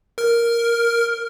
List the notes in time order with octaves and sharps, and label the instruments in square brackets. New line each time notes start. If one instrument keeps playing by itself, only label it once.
[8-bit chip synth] A#4 F6